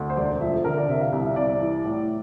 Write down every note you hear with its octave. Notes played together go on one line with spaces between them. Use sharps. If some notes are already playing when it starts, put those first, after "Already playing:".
Already playing: D2
C5
E1 D5
F3 E5
A4
D3 A#4
D5
C3 E5
F5
C2 E5
E5
C2 D5
E3
A2